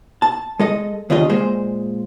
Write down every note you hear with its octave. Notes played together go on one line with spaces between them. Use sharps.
A5
G#3 A4 D#5
D#2 C#3 D4 F4 D#5
A#2 G#3 C5